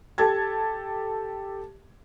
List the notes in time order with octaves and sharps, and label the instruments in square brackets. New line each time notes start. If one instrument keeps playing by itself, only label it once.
[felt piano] G4 A4 A5 G#6